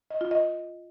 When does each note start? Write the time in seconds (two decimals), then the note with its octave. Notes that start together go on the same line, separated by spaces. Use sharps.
0.10 D#5
0.21 F4
0.31 D#5